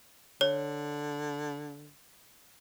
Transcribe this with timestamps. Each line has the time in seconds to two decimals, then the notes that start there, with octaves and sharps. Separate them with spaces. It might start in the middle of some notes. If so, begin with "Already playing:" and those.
0.41 D3 C#5